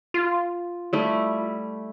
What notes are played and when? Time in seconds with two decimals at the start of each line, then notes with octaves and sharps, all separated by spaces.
0.14 F4
0.93 G3 A3 E4